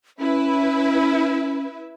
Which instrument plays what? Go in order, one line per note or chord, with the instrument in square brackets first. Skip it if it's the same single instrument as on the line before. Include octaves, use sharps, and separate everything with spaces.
[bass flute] C#4 [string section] E4 B4 E5